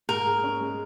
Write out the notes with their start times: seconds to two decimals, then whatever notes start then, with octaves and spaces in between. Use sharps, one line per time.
0.09 G#2 A#4
0.26 G#4
0.44 C#4
0.61 G#3